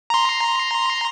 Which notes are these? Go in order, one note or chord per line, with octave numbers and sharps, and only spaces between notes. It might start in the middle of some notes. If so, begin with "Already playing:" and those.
A#5 C6